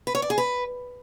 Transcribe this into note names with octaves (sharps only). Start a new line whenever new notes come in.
B4
C#5
D5
G#4
B4